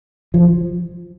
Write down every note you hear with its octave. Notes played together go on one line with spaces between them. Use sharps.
F3